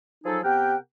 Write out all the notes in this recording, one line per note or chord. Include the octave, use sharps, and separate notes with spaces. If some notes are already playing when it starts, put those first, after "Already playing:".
F3 F#3 D#4 G#4 A4
C3 B3 G4 A#4 F#5 G5